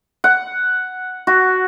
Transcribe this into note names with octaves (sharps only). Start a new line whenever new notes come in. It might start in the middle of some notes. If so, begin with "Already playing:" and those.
F#5
F#4